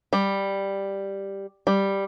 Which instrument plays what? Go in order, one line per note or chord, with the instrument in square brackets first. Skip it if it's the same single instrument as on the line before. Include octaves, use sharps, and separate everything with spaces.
[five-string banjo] G3
G3